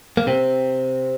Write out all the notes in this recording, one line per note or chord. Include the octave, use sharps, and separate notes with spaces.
A#3
C3 C4